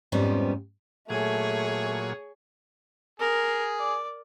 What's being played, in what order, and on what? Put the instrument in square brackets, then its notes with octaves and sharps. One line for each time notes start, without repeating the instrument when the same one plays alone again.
[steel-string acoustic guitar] F2 G#2 F3 G3 B3 C#4
[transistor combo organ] A#2 F#3 G#5 [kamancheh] A3 [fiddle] G#4 C#5
[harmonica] G#4 [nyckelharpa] A#4
[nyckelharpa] D5